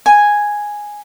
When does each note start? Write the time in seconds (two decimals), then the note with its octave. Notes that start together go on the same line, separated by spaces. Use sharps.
0.06 G#5